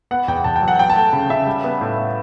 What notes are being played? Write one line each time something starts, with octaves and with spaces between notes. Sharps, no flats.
B3 F#5
E2 G5
E2 A5
G5
F#3
F#5
F#3 G5
A5
A3
C#3
C#3 E5
G3
B3
A2
B3